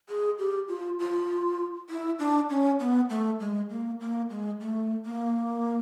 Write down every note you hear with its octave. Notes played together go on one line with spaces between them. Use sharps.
G#4
G4
F4
F4
E4
D4
C#4
B3
A3
G#3
A#3
A#3
G#3
A3
A#3